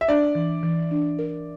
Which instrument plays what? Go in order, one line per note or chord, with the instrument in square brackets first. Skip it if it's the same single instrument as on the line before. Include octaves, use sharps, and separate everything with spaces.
[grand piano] E5
[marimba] D4 [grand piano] D5
[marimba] E3
E3
D4
A#4